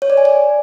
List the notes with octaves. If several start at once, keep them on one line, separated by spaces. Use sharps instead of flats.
C#5
D5
G#5
D5